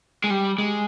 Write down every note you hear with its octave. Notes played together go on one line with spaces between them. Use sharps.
G#3
G3
G#3